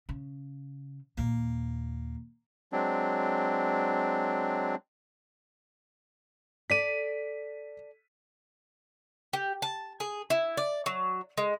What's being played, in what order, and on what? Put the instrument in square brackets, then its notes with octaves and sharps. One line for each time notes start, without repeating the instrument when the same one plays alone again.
[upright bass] C#3
[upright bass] D#2 A#2 [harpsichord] A#3
[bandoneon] F#3 G#3 C4 D4
[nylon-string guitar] A4 D5 [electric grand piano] B6 D#7
[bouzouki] G4
A5
G#4
E4
D5
F#3
G#3